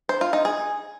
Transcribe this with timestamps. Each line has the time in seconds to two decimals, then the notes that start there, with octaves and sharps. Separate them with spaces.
0.09 C5
0.21 F4
0.33 D#4
0.45 G#4